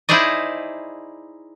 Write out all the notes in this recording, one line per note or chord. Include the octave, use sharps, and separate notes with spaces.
D#4 E4 G#4 C5 D5 D#5